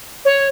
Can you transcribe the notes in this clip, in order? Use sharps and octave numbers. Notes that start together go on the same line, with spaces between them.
C#5